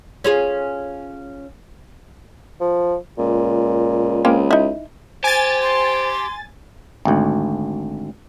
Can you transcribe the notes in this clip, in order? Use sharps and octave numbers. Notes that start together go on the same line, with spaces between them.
C#4 F4 G#4
F3
C#2 A#2
C#2 A#3 C4 C#4
D#4 E4
G4 C5 G#5 A6
C6
G#1 D2